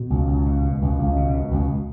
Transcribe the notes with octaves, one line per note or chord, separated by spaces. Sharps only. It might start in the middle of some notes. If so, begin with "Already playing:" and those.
Already playing: B2
C#2
C#2
B2
B2
C#2
C#2
B2
B2
C#2